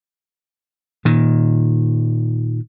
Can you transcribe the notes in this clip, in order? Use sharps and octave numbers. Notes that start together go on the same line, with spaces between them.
A#2 D#3